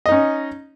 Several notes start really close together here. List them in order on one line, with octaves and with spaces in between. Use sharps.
D#5 D#4 C#4